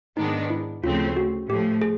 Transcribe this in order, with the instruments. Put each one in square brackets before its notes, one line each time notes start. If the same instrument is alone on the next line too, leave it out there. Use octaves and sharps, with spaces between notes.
[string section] G#2 D#3 G#3 B3 D4 [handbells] D#4
[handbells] E4
[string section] D2 C#3 F3 A3 C4 [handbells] F4
[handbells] F#4
[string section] A2 F3 A3 [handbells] G4
[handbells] G#4